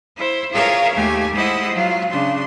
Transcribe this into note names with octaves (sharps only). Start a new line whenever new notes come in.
E4 C5
F4 G#4 A#4 C#5 E5 F5
D#2 A3 G4 G#5
G#3 E4 C5 D#5 F#5 D#6
F#3 F4
C#3 D4 C6